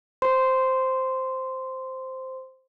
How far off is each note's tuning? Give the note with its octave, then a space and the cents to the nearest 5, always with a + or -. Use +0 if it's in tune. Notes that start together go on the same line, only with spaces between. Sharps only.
C5 +0 C6 -10